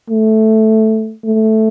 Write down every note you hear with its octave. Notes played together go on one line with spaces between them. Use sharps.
A3
A3